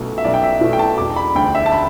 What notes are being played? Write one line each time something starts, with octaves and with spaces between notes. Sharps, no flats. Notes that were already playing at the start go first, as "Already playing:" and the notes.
Already playing: B1 B2 A3
E5
B1 D5
G5
E5
B2 A3
G5
A5
E1 D6
B5
D2 D3 G5
E5
A5
B5